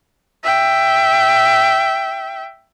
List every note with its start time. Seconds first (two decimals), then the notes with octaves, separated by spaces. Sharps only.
0.43 E5 G5